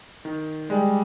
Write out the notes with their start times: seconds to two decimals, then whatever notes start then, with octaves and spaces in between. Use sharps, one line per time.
0.25 D#3
0.70 G3 G#3